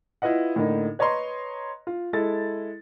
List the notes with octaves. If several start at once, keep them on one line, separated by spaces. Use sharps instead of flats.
E4 F4 B4 D#5 F#5
A2 D3 A#3 D#4
B4 C#5 D#5 A#5 C6
F4
G#3 E4 A4 A6